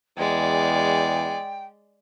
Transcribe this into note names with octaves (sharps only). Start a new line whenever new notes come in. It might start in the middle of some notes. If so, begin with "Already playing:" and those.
E2 G#3 D5 G5